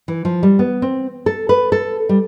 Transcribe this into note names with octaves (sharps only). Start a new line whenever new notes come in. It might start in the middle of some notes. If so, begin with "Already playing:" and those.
E3
F3
G3
B3
C4
A4
B4
A4
G3